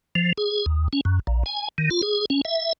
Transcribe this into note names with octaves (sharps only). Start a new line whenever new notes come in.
F3
G#4
D#2
C#4
F#2
A#1
G#5
D#3
F4
G#4
C#4
E5